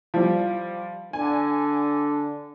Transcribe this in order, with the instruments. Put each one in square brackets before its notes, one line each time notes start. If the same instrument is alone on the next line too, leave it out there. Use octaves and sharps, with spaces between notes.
[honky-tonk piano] F3 G3
[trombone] D3 [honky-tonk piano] G#5